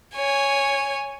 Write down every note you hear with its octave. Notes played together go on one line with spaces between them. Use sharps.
C#5 G#5